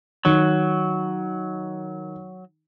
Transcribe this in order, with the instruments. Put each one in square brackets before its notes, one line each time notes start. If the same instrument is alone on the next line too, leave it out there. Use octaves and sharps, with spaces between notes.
[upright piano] D#3 [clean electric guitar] F#3